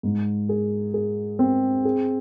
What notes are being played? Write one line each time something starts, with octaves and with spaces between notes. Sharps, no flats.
G#2
G#4
G#4
C4
G#4